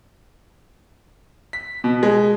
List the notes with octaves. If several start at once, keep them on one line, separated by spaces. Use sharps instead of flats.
B6
B2
G#3